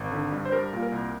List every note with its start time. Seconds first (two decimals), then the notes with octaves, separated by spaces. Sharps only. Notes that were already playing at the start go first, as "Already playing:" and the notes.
Already playing: G#1
0.11 D3
0.32 G2
0.45 C5
0.52 G3 A#4
0.73 A#2
0.83 A#4
0.92 C2